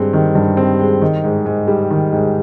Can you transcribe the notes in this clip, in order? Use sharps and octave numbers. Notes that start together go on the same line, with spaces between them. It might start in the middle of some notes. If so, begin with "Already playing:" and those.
Already playing: G2 G#3 C4
D#3
G2
C4
G#3
D#3
G#2
G#2
G3
D#3
G#2